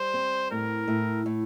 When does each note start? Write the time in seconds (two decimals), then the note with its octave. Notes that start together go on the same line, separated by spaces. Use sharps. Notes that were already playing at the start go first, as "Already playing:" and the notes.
Already playing: G3 C5
0.14 C4
0.51 A2 A#4
0.88 A2
1.26 A2